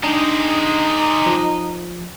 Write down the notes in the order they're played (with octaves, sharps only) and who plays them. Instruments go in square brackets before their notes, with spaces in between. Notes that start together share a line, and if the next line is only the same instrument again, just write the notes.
[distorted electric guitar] G#3 G4 [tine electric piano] D4 [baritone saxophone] D#4
[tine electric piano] F3